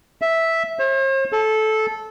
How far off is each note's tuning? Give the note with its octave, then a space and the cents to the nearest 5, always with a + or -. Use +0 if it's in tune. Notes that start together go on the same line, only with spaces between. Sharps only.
E5 -5
C5 +45
A4 -15